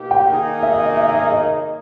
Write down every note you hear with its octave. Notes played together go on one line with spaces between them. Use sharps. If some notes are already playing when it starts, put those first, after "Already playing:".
Already playing: B2 A#3 D#4 G4
G5
D#3 A#3 D#4 G#4
E5
E5
D#5
E5
E5
E5
D#5